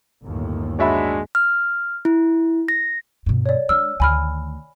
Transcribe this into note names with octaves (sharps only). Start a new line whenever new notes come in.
G1 D#2 A2
G#3 D4 F#4 C#5 D5 E5 B5
F6
E4
A#6
G2 B2
C#5 D5
G#3 D4 E6 F6
D2 D#3 G#5 B5 F6